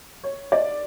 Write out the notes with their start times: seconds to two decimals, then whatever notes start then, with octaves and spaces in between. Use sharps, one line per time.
0.24 C#5
0.52 D5